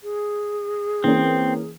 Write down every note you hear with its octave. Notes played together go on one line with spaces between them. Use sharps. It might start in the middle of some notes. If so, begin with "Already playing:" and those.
G#4
E3 A#3 C4 C#4